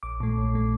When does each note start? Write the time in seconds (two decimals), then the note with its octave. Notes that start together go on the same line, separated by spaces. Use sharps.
0.03 A#1 D6
0.20 A#2 A3
0.37 A#1
0.54 A#2 A3